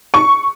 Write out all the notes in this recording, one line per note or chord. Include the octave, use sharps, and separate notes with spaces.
C#6